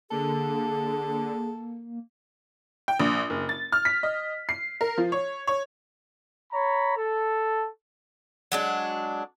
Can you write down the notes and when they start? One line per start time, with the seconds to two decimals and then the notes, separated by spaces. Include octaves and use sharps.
0.11 D3 A#3 G#4 A4
2.88 G5
3.00 A#1
3.30 F#1
3.49 A6
3.72 F6
3.85 B6
4.03 D#5
4.49 C7
4.81 A#4
4.98 F3
5.12 C#5
5.47 C#5
6.53 C#5 A#5 B5
6.97 A4
8.52 F#3 G#3 D4